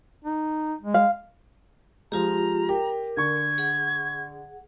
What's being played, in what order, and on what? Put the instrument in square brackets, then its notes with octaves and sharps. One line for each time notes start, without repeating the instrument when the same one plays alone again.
[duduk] D#4
G#3
[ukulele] F5
[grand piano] F3 G#3 [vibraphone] F4 G4 [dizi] A#5
[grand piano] G4 [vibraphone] A#4
[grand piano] D3 C#6 [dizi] G#6
[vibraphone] G#4 F#5